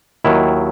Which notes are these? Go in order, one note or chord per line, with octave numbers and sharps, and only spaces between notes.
D#2 D#3 F#3 E4